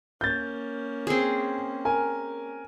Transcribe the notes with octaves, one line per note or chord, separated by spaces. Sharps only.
A#3 C#4 G6 A6
C4 G#4
A#4 G#5